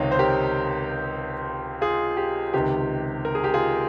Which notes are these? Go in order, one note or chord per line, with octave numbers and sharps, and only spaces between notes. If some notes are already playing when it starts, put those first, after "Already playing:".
Already playing: C#2 C3 D#3 C#5 D#5 F5 G5
C5
G4 A#4
F4 G#4
G4
C#2 C3 D#3 G4
A#4
G#4
G4
F4 G#4